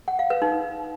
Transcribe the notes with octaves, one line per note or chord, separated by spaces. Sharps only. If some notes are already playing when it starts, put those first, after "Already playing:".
F#5
F5
B4
D#4